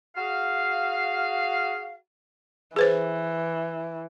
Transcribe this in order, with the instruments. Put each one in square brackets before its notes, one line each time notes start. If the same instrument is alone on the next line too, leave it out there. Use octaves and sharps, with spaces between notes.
[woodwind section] F#4 G#4 F5
[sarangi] E3 [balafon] G#4 B4 C5